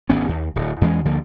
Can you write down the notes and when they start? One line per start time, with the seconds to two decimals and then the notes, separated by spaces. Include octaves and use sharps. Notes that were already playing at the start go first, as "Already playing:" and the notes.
0.09 G#1 D2 B3 C#4
0.29 D#2
0.56 D1
0.81 E2 E3 G#3 C#4
1.05 D2 D3 F3 A#3